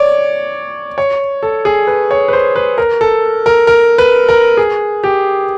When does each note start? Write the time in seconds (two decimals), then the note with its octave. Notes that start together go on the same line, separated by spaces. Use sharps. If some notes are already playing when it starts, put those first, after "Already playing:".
Already playing: C#5 D5
0.98 C#5
1.43 A4
1.65 G#4
1.87 B4
2.11 C#5
2.28 B4
2.33 C5
2.56 B4
2.78 A#4
3.01 A4
3.46 A#4
3.67 A#4
3.98 B4
4.29 A#4
4.57 G#4
5.04 G4